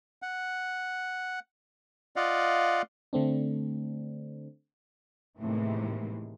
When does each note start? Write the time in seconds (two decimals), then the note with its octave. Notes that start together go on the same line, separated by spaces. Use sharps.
0.22 F#5
2.16 F4 D5 D#5 F5 F#5
3.13 D3 A3 C4 D4
5.40 A2 C3 D#3 E3 G#3 A#3